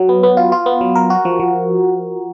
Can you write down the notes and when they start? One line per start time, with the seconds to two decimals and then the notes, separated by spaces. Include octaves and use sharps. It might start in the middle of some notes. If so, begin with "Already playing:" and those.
Already playing: F#3
0.09 B3
0.23 B3
0.37 F4
0.52 F4
0.66 B3
0.81 F#3
0.95 A#4
1.10 F#4
1.25 F3
1.40 F3